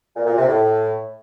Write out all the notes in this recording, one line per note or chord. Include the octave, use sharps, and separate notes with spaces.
A#2
A#2
C3
A2